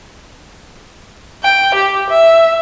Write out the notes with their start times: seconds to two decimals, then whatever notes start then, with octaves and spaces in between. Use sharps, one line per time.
1.43 G5
1.75 G4
2.10 E5